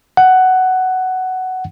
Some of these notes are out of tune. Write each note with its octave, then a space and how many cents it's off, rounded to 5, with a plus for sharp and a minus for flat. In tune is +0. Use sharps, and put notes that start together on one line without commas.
F#5 +10